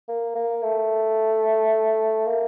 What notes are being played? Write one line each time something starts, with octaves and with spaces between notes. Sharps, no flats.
A#3
A#3
A3
A#3